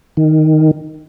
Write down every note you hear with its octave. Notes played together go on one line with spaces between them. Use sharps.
D#3